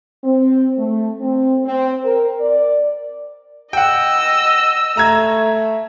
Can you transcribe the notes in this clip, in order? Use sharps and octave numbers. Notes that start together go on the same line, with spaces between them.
C4
A3
C4
C4
A#4
D5
D#5 F#5 G5 E6
A3 A#5 G#6